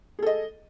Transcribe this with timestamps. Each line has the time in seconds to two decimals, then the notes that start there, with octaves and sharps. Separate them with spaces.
0.19 G#4
0.23 A4
0.26 D#5